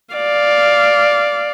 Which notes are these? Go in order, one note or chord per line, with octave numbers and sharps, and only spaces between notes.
D5 F5